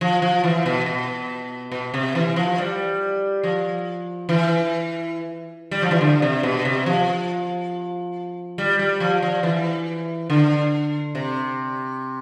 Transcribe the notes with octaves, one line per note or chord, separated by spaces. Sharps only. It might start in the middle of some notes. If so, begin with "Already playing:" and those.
F3
F3
E3
B2
B2
B2
C3
E3
F3
G3
F3
E3
G3
F3
E3
D3
C3
B2
C3
F3
G3
G3
F3
F3
E3
D3
C3